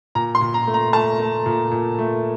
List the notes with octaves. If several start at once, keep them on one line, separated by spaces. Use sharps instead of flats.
A#2 A#5
C6
A#2
A#5
A3
A#5
A3 A5
A3
A#2
A#2
A3